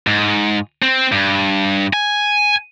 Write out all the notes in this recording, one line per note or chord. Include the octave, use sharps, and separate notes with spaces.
G#2
C4
G2
G#5